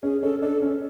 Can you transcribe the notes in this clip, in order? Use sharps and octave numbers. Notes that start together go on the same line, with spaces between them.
C#4 G#4
C#4 A4
D4 A4
C#4